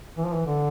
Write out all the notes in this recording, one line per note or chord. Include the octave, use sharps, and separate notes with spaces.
E3
F3
E3
D3